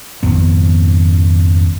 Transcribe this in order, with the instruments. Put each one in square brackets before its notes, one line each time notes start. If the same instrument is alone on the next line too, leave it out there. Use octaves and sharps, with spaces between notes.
[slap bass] G#1 F2 B3